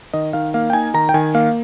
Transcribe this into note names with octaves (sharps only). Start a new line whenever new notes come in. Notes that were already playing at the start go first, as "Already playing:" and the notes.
D#3 D#5
D#3 F5
A#3 F5
G5
D#4 G#5
D#3 A#5
G5
D#3 G#5
A#3 F5